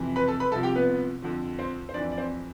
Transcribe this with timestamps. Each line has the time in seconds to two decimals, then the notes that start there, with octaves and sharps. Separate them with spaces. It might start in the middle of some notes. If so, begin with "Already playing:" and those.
Already playing: F2 C3 E3
0.16 B4 B5
0.28 A4 A5
0.40 B4 B5
0.52 C2 C3 F3 A4 A5
0.63 G4 G5
0.75 B3 B4
1.22 F2 D3 F3
1.59 C4 C5
1.89 C5
1.94 F2 E3 D4 D5
2.12 D5
2.17 C4 C5